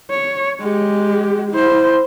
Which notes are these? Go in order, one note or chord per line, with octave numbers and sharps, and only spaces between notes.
C#5
G#3 G4
E4 C5